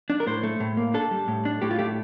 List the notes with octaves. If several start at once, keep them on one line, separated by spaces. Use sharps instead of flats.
D4
A#4
A2 C5
A3
A2
A#3
D4 A4
G3
A2
D4
A2 G4
F4
A3 G4